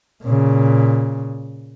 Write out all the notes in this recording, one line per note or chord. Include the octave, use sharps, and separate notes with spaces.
A#2 C#3